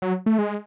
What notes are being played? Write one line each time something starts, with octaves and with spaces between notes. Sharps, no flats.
F#3
A3
G#3